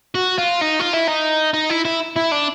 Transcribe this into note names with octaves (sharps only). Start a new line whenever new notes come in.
F#4
F4
D#4
F4
E4
D#4
D#4
E4
E4
E4
D4